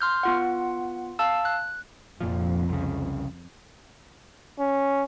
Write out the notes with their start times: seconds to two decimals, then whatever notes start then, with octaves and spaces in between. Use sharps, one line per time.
0.01 C6 F6 G6
0.23 B3 F4 F#5
1.19 F5 A5 E6
1.45 F#6
2.21 F1 F2 A#2 F3
2.69 C2 C#3
4.59 C#4